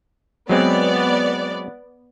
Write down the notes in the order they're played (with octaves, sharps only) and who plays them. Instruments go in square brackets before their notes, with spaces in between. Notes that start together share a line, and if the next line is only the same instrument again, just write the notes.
[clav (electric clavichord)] F#3 G#3 C4 [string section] B3 D5